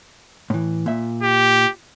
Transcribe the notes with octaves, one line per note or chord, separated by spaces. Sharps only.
A2 E3
A#2 E5
G4